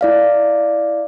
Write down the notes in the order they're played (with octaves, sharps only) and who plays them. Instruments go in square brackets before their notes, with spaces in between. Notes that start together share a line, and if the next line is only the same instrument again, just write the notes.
[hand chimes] E4 D5 F5